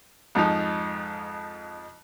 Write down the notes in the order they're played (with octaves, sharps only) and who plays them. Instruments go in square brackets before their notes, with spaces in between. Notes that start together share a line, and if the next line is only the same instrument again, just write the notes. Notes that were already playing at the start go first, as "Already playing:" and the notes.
[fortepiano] F2 G#2 F3 D#4